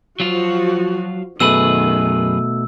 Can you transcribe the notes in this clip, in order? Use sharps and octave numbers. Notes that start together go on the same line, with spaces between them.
F3 F#3 F4 F#4
F#2 B2 D#3 A3 G#4 B4 E6